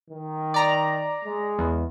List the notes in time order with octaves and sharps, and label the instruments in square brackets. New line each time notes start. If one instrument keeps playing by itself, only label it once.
[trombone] D#3
[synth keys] D5 A#5
[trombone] G#3
[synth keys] E2